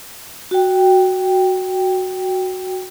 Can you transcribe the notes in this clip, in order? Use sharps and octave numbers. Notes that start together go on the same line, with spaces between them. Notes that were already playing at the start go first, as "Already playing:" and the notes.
F#4 G5